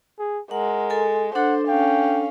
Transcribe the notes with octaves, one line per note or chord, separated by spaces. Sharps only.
G#4
G#3 A#4 F#5
A4 G#5
D4 A4 C5 F#5
C#4 F5 G5